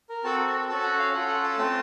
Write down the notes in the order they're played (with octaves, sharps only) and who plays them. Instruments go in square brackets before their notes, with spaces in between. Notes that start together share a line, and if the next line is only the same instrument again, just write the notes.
[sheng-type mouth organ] A#4
C4 F#4 A4 A5
A5
C#4 F#4 A4 A5
F#5
F5
C#4 F4 A4 F#5
F#5
A5
A3 C4 F4